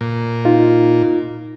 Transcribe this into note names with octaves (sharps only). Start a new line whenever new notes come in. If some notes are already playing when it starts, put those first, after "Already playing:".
A#2
D#4 F4